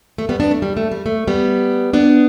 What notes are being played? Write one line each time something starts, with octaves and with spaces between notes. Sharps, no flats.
A3
G3 B3
B3 D4
A3
G3
A3
G3
A3
G3 B3
B3 D4